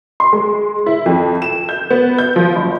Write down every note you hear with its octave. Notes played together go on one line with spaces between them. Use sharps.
C6
G#3
E4
F2
E7
G6
B3
G6
F3
F#1